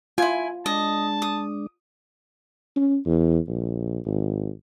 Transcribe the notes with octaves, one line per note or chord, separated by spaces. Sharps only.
E4 F4 G#5
G#3 D4 D#5 A5
D#6
C#4
E2
A#1
G#1